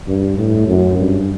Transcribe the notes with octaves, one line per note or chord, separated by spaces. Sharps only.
G2
A2
F#2
G2